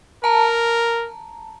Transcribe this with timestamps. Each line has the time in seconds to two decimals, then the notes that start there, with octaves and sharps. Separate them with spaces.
0.24 A#4 A5 A#5